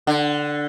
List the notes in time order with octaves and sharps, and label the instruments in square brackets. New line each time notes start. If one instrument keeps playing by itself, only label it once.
[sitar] D3